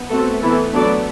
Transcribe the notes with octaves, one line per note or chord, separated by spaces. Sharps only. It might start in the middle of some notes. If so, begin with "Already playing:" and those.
Already playing: B3
A3 C4 F#4 A4
E3 B3 E4 A4
F#3 B3 D4 A4 D5